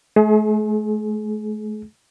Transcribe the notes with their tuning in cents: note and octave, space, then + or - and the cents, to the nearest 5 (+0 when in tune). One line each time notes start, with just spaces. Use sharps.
A3 -40 G#4 +30